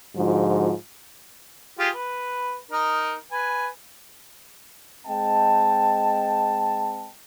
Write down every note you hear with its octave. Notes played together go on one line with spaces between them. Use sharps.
G#2 D3 F3 G#3 F4 F#4
F4 G4 G#4
B4
D#4 A#4
B4 G#5
G#3 C4 D#5 G5 A5